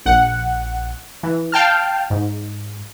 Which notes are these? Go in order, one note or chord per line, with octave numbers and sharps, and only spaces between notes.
A#1 F#5
E3
F5 G5 A5 F6
G#2